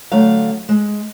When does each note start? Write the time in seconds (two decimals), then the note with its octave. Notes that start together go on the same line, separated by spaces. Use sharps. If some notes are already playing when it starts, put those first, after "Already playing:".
0.12 D3 F#3 A3 F5
0.69 G#3